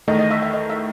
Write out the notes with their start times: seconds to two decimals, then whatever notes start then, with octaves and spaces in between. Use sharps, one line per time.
0.08 E2 D#3 A3 D#5
0.19 D#5
0.31 E5
0.42 E5
0.53 D#5
0.70 E5